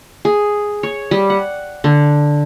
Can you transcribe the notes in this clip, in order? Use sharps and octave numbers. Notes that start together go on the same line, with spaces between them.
G#4
C#5
G3
F#5
D3